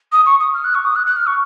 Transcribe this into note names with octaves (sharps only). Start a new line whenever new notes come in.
D#6
C#6
D#6
F6
F#6
C#6
D#6
F#6
F#6
F6
C#6